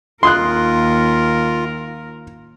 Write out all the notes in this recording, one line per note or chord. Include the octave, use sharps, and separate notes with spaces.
D#2 F4 A#4 C6 D#6 F#6